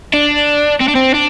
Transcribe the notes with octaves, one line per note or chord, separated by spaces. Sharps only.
D4
C4
D4
C4
D4